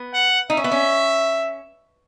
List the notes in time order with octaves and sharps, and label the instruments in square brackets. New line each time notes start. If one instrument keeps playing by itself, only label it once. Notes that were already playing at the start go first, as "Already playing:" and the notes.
Already playing: [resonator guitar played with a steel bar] B3
[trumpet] F#5
[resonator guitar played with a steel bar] D#4 [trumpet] E5
[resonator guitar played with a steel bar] C#4
B3
C#4